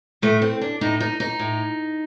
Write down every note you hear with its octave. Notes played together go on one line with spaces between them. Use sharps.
A2 A3
C4
D4
A2 D#4
D#4
D#4
A2